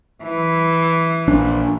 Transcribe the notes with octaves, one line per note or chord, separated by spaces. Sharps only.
E3
A#1 D4